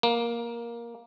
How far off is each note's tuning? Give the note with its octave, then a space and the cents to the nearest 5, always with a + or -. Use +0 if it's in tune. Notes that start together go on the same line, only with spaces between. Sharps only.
A#3 +10